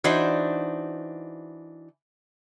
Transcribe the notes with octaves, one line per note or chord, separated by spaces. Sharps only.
E3 D4 D#4 F#4 C5